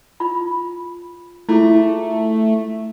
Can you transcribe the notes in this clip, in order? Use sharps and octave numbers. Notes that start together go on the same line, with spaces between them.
F4 B5
A3 E4 F4 G#4